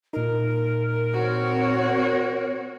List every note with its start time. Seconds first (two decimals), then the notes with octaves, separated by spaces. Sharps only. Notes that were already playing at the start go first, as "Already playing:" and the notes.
0.13 A#2 D#4 A#4
1.14 C4 F#4 C#5